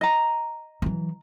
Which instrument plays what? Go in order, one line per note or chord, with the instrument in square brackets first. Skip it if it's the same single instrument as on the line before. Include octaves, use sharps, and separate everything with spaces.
[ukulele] D#5 A#5
[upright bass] E3 F#3